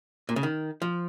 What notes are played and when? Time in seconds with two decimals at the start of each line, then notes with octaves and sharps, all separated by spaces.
0.29 A#2
0.36 C#3
0.43 D#3
0.82 F3